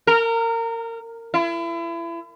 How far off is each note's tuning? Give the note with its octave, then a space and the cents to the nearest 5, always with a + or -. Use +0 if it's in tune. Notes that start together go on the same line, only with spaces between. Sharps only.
A#4 -25
E4 +35